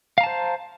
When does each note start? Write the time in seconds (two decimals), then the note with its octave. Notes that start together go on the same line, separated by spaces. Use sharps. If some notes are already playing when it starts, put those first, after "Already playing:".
0.18 F5
0.21 A#5
0.24 A5
0.26 C5